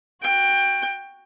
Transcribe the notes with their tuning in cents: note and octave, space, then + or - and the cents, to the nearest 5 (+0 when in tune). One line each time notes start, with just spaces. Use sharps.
F#4 +0 G5 +20